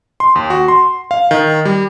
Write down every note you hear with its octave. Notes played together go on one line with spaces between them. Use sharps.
C6
D#2
F#4
C6
F5
D#3
G3